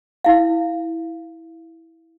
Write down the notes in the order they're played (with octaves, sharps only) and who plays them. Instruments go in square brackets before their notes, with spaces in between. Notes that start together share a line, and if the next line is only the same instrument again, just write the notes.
[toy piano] E4 F5